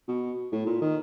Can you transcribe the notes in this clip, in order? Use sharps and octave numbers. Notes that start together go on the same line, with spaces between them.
B2
A2
A#2
D#3